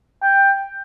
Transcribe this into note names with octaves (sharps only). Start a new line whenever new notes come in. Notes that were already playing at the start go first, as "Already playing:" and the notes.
G5